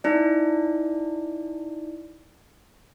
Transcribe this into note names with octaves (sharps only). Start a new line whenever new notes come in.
D#4 E4 D5